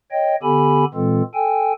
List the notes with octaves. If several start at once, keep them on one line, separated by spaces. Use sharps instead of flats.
C#5 D#5 G5
D3 B3 G4 A4 G#5 B5
A#2 E3 G#3 C4 F4 A4
A4 G5 G#5